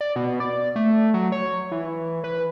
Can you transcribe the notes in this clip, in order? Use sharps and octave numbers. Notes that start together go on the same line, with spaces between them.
D5
B2
D5
A3
F#3
C#5
E3
B4